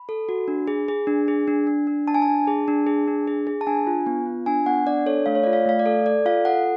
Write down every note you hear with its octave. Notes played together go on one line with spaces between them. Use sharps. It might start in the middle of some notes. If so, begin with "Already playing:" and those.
Already playing: B5
A4
F#4
D4
G#4
G#4
D4
G#4
D4
D4
D4
D4 A5
G#5
D4 A5
G#4
D4
G#4
D4
G#4
G#4
A5
D4 G#5
F4
B3
F4
D4 G#5
B3 F#5
D4 D5
A4 C#5
A3 F5
C#5
F4 D5
F5
A3 F5
D5
A4
A4 D5
F4 F5
A4 F#5